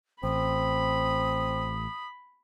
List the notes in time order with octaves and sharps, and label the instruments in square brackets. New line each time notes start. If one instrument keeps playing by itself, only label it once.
[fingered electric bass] A1 [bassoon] C4 [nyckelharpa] B5 [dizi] D#6